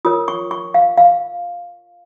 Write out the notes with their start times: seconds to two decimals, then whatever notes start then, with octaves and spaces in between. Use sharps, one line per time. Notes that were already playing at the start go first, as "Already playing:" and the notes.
0.05 F4 A#4 C#5 D#6
0.28 C#6
0.51 C#6
0.74 F5
0.98 F5